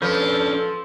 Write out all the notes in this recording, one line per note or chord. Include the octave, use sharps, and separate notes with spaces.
F3 C#4 D4 A4 B4 B5 G6